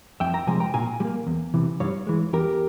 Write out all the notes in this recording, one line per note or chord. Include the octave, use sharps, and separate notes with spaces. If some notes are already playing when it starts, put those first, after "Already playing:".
F2 E5 G5
G5 A#5
C3 F3 G#3 G#5
G5 A#5
A#2 F5 G#5
G3
A#3
E2
C3 E3
G2 C#5 F5
E3 G#3
E2 G4 A#4